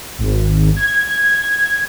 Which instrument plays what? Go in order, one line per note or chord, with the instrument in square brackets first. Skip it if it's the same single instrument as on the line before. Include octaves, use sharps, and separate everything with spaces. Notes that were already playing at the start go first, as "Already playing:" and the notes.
[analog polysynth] G#1
G#6